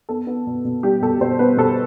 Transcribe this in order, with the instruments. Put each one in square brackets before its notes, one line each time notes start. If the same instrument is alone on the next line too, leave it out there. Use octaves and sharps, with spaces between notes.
[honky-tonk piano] B3 A4
B3
B2
B2
G3 G4
B2 A4
B2 C5
B3 B4
B2 A4